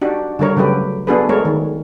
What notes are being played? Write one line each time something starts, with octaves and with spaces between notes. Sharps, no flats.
D4 D#4 F#4 G4
D3 G3 A#4 C#5
C#3 F#3 A3 G4 B4
B3 D4 F#4 G#4 A4 B4
G#3 A3 A#4 C#5
D#3